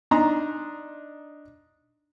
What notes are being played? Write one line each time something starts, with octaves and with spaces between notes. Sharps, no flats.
D4 D#4 A#5 C6